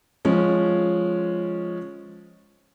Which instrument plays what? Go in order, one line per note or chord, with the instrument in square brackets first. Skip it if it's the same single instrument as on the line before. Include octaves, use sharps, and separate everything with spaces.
[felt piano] F3 G#3 C#4